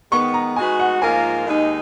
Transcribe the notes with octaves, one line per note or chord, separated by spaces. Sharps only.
D#3 G#3 B3 C#6
A#5
G#3 D#4 F#4 B4 G#5
F#5
G#2 F3 A#3 F4 A#4 G#5
D#2 D#3 G#3 D#4